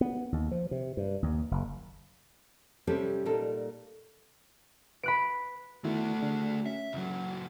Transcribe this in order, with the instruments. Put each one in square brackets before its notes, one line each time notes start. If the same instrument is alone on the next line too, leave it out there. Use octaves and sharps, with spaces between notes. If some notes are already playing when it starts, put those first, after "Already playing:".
[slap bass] B3
D#2
F3
C3
G2
D#2
F#1
[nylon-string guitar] C3 G3 C4 C#4 G4 A4
A#2 G3 D#4 A4
[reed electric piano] B4 [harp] B5 F#6 D7
[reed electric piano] D#3 B3 E4 [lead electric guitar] A3 F#4
[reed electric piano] D3 D4 G#4
[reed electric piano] C#4 [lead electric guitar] E5
[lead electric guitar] C#2 F#3